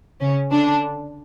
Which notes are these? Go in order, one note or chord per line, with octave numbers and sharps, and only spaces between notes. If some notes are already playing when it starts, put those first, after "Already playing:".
C#3 C#4
D3 D4